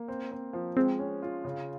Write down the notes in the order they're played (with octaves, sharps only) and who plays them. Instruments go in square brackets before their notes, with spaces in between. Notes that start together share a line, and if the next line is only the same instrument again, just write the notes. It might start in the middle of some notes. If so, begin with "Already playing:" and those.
Already playing: [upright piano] A#3
C4
C4
F3
[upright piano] G#3 [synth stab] C4
[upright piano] C#4
F4
C#3